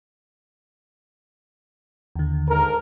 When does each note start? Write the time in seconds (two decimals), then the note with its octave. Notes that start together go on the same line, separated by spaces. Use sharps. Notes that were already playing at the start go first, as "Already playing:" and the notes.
2.16 D#2 D3
2.48 G#2 A4 A#4